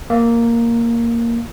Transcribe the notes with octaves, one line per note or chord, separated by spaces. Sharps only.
A#3